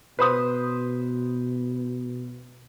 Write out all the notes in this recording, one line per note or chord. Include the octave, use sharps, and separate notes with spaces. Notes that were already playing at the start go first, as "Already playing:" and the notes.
B2 B4 C5 D#6